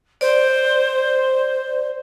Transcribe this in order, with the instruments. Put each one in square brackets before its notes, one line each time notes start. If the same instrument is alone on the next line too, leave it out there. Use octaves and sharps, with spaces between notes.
[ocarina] C5 [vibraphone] D5